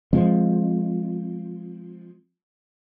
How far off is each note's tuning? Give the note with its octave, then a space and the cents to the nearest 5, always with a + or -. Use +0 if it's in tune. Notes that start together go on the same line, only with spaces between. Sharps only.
F3 +0 G#3 +0 C4 +0